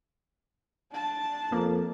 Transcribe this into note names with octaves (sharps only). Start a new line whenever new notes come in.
D4 A5
F2 A#3